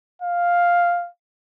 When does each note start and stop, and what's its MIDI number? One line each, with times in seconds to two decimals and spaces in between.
0.22 1.08 77